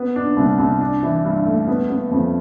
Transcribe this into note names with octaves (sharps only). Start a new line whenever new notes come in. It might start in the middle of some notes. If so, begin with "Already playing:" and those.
Already playing: B3
D4
C2
C2
D4
E3
G2
A3
B3
B3
F2